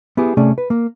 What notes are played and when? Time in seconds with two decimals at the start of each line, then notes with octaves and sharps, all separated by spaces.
0.17 B3 E4 G4 G#4
0.37 C3 A3 C#4 G#4 D5
0.58 B4
0.70 A#3